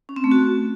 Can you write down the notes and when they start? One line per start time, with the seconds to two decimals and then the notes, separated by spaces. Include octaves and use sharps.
0.09 C#4
0.16 C4
0.24 A3
0.32 F#4